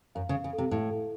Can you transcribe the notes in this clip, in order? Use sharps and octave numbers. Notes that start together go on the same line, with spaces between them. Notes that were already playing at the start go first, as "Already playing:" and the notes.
F#2 F5
C#3
F5
C#3
A4
C3
A2 F5
A4